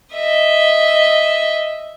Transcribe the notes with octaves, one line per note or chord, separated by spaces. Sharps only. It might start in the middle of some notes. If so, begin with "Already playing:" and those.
D#5 E5